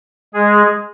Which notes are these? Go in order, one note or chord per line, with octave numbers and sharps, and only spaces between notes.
G#3 G#4